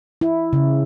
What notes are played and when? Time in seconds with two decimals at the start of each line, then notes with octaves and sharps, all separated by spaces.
0.21 E4
0.53 C#3